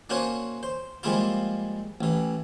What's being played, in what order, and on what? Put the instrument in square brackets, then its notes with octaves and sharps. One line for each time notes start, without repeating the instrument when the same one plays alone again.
[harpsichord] A#3 C#4 D4 F#4 C5 G#5
C5
F3 G3 G#3 A#3 E4 F4
A1 E3